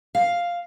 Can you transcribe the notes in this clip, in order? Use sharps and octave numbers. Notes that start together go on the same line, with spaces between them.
F5